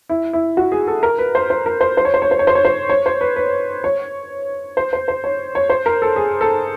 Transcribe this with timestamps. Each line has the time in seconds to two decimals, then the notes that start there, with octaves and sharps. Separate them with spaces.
0.09 E4
0.33 E4
0.57 F#4
0.72 G#4
0.87 A4
1.03 A#4
1.18 B4
1.35 C5
1.50 C5
1.66 A#4
1.81 C5
1.97 C5
2.05 C#5
2.14 C5
2.22 C#5
2.31 C5
2.39 C#5
2.47 C5
2.55 C#5
2.65 C5
2.89 C#5
3.06 C5
3.21 B4
3.36 B4
3.84 C#5
4.77 C5
4.93 C5
5.08 C5
5.24 C#5
5.55 C#5
5.70 C5
5.86 A#4
6.02 A4
6.16 G#4
6.41 A4